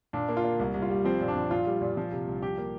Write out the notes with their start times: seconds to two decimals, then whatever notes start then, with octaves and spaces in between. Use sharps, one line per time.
0.13 A#2 D4
0.29 A#3
0.37 F4
0.44 A#3
0.59 C2
0.74 C2
0.82 F4
0.90 G3
1.05 F3 C4
1.20 A#2
1.28 D4
1.35 F3
1.51 A#2 F4
1.66 G3
1.81 A#2
1.97 F3
2.12 C3
2.27 C2
2.42 F3 G4
2.58 A#3